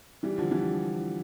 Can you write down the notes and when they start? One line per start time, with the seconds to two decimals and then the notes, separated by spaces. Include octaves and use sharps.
0.23 E3 G3
0.38 D3 F3
0.51 E3 G3